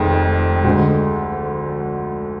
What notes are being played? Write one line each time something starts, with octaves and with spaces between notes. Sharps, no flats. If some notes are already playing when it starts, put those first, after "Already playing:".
Already playing: F1 F2 D#3 G#3
D2 D3 G#3